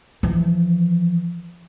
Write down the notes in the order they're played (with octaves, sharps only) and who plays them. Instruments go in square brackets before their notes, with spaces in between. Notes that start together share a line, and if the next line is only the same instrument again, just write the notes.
[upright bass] E3 F3